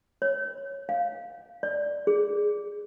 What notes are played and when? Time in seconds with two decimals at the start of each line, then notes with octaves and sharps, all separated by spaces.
0.22 C#5
0.89 F5
1.63 D5
2.07 G#4